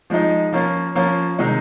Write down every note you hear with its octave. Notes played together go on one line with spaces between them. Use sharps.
F3 G#3 D#4
F3 A#3 C#4 F4
F3 A#3 C#4 F4
C3 D#3 G#3 D#4